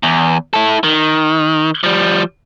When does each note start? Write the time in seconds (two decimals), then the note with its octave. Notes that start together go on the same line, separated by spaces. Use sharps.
0.03 E2
0.53 E4 A4
0.84 D#3
1.84 F3 G3